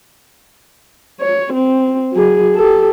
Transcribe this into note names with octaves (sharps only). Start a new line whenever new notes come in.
C#5
C4
F#3 G#4
G4 A4